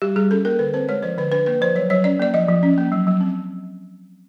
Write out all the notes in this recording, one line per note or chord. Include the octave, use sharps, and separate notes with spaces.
G3 G4
G3 G#4
C#4 A4
A#3 A#4
D3 B4
C4 C5
G#3 C#5
F3 C5
D3 B4
D4 B4
A#3 B4
F3 C5
F#3 C#5
F#3 C#5
C#4 D5
A#3 D5
F3 D#5
F3
C#4
A#3
F#3
F#3
C4